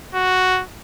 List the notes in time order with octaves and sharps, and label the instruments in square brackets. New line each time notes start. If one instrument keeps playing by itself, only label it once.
[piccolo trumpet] F#4